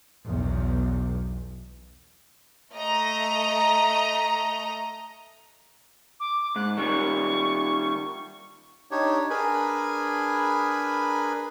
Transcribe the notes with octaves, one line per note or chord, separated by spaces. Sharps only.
B1 E2
A3 D#5 A#5
D6
G#2 F#6
D#3 G3 C#6
D4 D#4 G4 C#5
D4 G#4 A#4 B4 G#5 B5